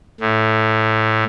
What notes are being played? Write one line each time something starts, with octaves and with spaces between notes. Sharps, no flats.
A2